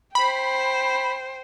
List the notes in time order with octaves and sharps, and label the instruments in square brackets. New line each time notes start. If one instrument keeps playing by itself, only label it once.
[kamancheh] C5 G5 [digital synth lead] B5